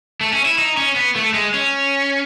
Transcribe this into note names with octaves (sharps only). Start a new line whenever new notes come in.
A3
C#4
E4
D#4
C#4
B3
A3
G#3
C#4